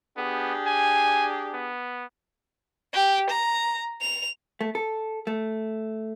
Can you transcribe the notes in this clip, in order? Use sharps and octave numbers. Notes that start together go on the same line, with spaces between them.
B3 D4 G4 G#4
G#5
B3
G4
A#5
F7
A3
A4
A3